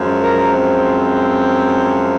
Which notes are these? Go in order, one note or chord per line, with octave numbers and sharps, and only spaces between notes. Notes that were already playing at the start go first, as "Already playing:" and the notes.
Already playing: F#2 F3 G#3
A#4
C4